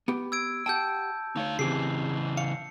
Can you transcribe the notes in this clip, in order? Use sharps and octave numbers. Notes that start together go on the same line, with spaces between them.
B3 G4
E6 G#6 D7
G4 F#5 G5 A5 E6 G6
D2 D#4 C#5 F5
C#3 E3 C4 G4 G#4 C7
F5 C#7